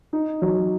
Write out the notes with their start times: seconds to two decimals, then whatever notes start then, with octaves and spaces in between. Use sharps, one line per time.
0.13 D#4
0.42 F#3